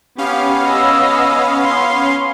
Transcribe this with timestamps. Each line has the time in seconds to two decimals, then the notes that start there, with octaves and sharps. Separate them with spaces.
0.18 B3 C#4 G4 F5
0.66 D#5 E6
1.65 C6